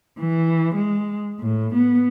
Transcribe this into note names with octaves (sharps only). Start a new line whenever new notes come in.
E3
G#3
A2
B3